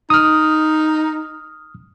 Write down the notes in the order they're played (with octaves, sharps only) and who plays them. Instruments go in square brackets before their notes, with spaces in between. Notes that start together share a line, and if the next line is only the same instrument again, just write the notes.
[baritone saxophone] D#4 [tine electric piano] D#6 F6